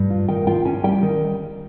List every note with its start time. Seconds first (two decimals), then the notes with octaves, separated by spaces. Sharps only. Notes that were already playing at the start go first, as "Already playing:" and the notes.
Already playing: G2
0.10 F4
0.28 D#3 G5
0.47 F4 G5
0.65 C#4 G#5
0.84 G3 G5
1.02 D#3